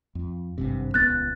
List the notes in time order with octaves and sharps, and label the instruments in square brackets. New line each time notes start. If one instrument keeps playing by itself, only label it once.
[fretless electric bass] F2
G#1 G2 C3
[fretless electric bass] D#1 C#2 B3 [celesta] F#6 A6